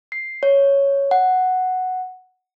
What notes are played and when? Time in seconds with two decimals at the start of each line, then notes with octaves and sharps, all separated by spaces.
0.12 C7
0.43 C#5
1.11 F#5